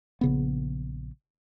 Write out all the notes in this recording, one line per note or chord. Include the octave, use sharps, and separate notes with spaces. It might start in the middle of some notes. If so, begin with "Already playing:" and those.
A#1 C#3 B3